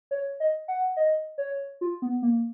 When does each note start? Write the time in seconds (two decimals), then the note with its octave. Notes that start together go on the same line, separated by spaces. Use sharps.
0.11 C#5
0.40 D#5
0.68 F#5
0.97 D#5
1.38 C#5
1.81 F4
2.02 B3
2.22 A#3